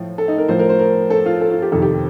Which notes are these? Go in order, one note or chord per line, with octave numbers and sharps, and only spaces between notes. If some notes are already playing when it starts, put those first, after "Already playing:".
Already playing: A2 F3
A4
D#4
A#4
A2 F3 C5
A#4
C5
A#4
A4
F4
A4
F4
G4
F2 C3 D#3 A4
G4